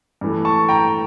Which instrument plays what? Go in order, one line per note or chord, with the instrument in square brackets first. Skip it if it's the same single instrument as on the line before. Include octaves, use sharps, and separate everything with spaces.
[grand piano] G2 E3 A3
A5 C#6
G5 A#5